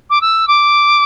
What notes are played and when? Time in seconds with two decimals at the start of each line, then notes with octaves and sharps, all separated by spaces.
0.10 D6
0.21 E6
0.47 D6